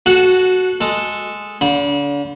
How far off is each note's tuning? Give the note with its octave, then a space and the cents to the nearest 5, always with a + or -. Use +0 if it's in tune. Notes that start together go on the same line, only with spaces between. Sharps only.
F#4 +0 A4 -20 F#5 -15
G#3 +0 A4 +0
D3 -40 B5 -35